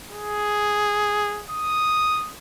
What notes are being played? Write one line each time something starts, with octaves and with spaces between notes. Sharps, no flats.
G#4
D#6